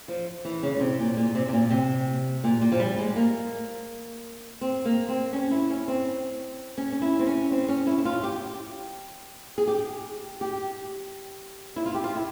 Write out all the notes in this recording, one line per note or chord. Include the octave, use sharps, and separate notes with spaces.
F3
E3
C#3
A#2
C3
A#2
A#2
C3
C3
A#2
C3
A#2
A#2
F3
G3
G#3
A#3
C4
A#3
C4
C#4
E4
C#4
C4
C#4
C#4
E4
C4
C#4
C4
C#4
E4
E4
F4
G4
G#4
G4
G4
E4
F4
G4
F4
E4